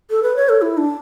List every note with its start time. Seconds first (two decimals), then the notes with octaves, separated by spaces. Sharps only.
0.11 A4
0.23 B4
0.36 C#5
0.49 A4
0.62 E4
0.77 D4